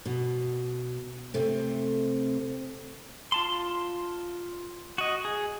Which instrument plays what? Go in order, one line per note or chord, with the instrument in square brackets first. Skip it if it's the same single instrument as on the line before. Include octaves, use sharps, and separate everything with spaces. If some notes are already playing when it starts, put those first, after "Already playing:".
[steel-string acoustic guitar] B2
C3 A3 C4
[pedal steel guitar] F4 A5 C6
F#4 D#5
G#4